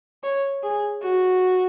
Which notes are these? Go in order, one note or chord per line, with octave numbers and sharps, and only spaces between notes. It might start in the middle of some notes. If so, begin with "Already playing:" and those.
C#5
G#4
F#4